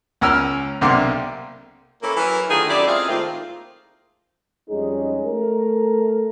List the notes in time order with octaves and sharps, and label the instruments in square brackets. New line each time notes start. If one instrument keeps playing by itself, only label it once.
[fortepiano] C#2 C#4 A#4 E6 F6
B1 C3 A#3 D4 C6
[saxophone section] E3 A#3 C#4 E4 A4
E3 F#3 A#4
D3 D#3 A3 D#4 F4 G#4
F#2 E4 G4 A4 D5
G#3 C4 F4 G#4 E5 F5
A2 D#3 A#3 C4 F4
[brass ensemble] F2 G3 G#3 C#4 D#4 G#4
A3 A#4